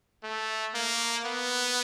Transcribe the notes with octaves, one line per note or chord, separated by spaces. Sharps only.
A3
A#3
B3